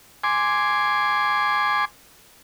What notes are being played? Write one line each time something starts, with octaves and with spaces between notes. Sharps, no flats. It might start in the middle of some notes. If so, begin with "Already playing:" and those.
G#5 C6 D6